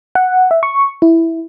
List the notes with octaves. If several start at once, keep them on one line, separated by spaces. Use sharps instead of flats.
F#5
E5
C#6
E4